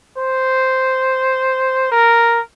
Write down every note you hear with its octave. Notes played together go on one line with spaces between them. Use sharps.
C5
A#4